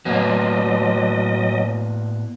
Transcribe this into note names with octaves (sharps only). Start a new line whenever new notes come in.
A2 F#3 A#3 B3 D#5